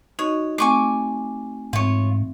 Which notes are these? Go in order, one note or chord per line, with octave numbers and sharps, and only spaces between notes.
D#4 F#4 C#5 D#5
A3 C4 G#5 C#6 D6
G#2 E3 C4 F4 C#5